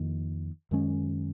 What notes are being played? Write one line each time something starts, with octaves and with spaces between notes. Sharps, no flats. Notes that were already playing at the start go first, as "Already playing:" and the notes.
Already playing: F2 D#3 A#3
F#2 D#3 G#3 C#4